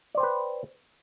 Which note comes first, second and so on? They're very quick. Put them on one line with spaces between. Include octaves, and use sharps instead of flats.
D5 C5 G5 B4